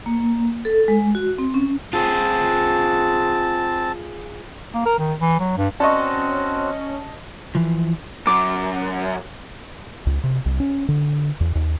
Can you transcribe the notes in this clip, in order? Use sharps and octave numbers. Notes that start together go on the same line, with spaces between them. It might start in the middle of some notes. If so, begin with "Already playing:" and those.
A#3
A4
G#3
F#4
C4
C#4
C4 F4 G#4 A5
A#3
A#4
D#3
E3
F#3
G2
C4 C#4 F#4 D5 D#5 A5 C#6
E3 F3
F#2 D6
C#2
C3
C2
C#4
D3
E2
D#2